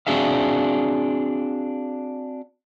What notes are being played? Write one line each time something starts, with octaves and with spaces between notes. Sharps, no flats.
C4 D4 F#4 G#4 E5 F5